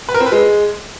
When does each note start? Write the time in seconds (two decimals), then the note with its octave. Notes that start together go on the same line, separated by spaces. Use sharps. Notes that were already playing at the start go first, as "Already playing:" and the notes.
0.09 B4
0.14 A#4
0.20 C4
0.26 B4
0.32 G#3